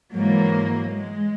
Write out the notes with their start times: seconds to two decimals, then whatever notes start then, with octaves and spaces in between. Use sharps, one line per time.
0.13 G#2 E3 F#3 A#3
0.90 G#3